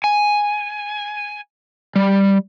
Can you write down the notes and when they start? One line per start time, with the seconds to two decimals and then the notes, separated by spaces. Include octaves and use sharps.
0.04 G#5
1.96 G3